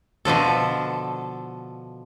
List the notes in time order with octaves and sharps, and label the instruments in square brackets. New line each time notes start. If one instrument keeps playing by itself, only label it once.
[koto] B2 D3 F3 A4